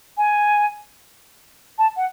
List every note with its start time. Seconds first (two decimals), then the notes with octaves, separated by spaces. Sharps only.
0.17 G#5
1.78 A5
1.97 F#5